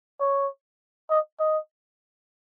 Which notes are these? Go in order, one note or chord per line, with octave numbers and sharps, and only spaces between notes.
C#5
D#5
D#5